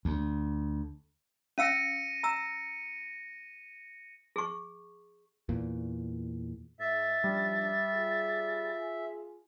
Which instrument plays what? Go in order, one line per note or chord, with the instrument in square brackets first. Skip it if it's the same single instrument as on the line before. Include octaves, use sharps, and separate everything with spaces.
[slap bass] D2
[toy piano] C#4 F5 E6 [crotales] A#6 C#7 D#7
[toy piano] A#5 E6
G#4 C#6
[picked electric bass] E2 A#2
[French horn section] G#2 [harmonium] E5 [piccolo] A6
[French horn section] F3 C#4 D4 [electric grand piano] G3
[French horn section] F4 G#4